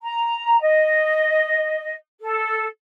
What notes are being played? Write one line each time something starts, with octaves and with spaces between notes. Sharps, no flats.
A#5
D#5
A4